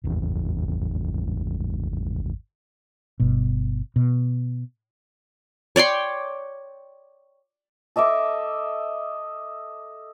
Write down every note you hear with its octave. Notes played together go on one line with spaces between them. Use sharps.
D1 G#1 E2
G1 B2
B2
C#5 D5 G5 C6
A4 D#5 E5 D6